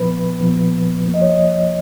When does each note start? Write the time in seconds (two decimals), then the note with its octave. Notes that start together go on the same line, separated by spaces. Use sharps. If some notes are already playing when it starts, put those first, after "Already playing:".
Already playing: A#2 F3 B3 B4
0.41 A#2 F3 B3
1.06 F2 F3 A#3
1.14 D#5
1.21 C#5
1.29 D#5